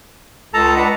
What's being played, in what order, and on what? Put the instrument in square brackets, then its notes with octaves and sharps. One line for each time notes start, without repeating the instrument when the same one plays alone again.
[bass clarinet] C#2 [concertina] A4 A5 A#5
[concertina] D4 B4 F#5